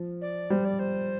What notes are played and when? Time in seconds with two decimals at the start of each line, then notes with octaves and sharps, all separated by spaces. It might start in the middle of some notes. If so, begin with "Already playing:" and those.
Already playing: F3
0.21 D5
0.50 G3 C5
0.65 D5
0.79 C5